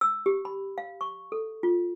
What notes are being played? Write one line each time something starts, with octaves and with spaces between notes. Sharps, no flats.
E6
G4
B5
F5
C#6
A4
F4